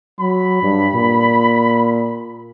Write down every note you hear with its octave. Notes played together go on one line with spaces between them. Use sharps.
F#3 B5
G2
A#2